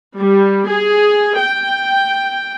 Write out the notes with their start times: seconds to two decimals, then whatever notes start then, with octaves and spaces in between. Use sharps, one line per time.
0.18 G3
0.70 G#4
1.40 G5